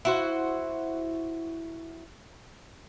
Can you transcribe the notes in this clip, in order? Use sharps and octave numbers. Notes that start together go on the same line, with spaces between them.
E4 F#4 C5